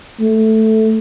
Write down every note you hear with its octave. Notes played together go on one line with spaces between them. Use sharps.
A3